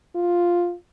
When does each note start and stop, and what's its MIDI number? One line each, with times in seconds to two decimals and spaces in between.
0.15 0.74 65